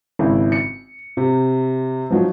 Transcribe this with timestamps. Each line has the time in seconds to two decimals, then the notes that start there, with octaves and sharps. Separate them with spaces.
0.19 G#1 C#3 E4
0.52 C#7
1.17 C3
2.10 F3 F#3 D#4